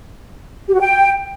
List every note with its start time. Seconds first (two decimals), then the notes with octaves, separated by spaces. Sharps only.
0.68 G4
0.73 F#4
0.79 G5